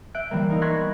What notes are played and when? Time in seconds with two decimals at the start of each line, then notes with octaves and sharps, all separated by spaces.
0.14 E5 F#6 G6 D7
0.31 E3 G3 A#3
0.50 D#4 A#4
0.61 C6 C#6 F#6 G#6 A#6 B6
0.75 B3